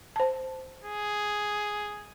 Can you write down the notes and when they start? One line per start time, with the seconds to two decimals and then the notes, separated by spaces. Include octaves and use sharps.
0.16 C5 A5
0.84 G#4